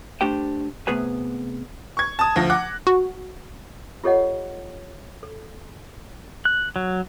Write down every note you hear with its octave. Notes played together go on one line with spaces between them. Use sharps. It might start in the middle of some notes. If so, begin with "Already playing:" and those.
A3 D4 G4 C5 G5
C3 A3 B3 G#4 B4 G#5
C#6 G#6
A5 D#6
D2 F3 A#6
F#5 D6 F#6
F#4
F4 G4 A4 C#5 D#5 F#5
A4
F#6
F#3